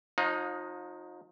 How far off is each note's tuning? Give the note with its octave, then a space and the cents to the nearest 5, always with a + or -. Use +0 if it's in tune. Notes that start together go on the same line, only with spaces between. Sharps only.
F3 +40 D#4 +0 F5 +35